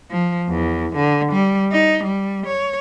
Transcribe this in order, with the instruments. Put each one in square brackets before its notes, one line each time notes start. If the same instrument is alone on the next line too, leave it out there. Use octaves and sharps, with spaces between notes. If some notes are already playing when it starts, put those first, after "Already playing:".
[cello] F3
E2
D3
G3
D#4
G3
C#5